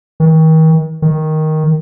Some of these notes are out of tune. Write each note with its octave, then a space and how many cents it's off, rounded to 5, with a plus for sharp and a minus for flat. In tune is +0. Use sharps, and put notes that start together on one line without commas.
D#3 +40
D#3 +5